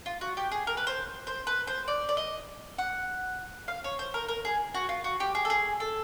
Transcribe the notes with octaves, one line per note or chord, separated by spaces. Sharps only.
F4
F#4
G4
G#4
A#4
B4
C5
C5
B4
C5
D5
D5
D#5
F#5
F5
C#5
C5
A#4
A#4
G#4
F#4
F4
F#4
G4
G#4
A4
G#4
A4